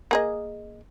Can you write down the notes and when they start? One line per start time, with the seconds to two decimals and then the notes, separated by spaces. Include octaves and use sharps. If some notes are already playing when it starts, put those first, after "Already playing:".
0.11 A#3 G#4 D#5